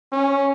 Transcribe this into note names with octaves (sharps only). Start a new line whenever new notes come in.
C#4